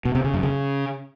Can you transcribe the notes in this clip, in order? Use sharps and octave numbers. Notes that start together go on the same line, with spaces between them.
B2
C3
C#3
F#2
C#3